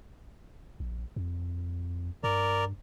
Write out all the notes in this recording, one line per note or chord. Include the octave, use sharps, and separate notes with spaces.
A#1
F2
G2 A#4 D5